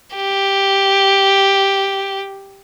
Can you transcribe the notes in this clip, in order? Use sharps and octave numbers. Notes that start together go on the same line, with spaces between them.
G4